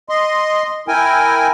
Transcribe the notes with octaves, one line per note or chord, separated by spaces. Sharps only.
D#5 C6
E4 A#4 G5 G#5